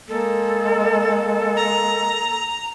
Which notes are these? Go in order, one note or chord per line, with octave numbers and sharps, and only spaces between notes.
G#3 A#3 A4
A#5